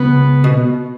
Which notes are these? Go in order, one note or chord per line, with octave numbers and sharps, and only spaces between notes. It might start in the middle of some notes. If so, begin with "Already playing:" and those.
Already playing: C#2 C#3 B3
B2